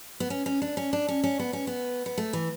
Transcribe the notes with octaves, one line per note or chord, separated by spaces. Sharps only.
B3
C#4
C#4
D4
C#4
D4
C#4
C#4
B3
C#4
B3
B3
A3
E3